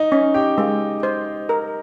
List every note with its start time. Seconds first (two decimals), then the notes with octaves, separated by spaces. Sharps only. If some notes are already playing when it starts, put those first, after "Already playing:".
Already playing: D#4 D#5
0.12 C#4
0.34 G4 G5
0.58 G#3
1.03 C5
1.49 A#4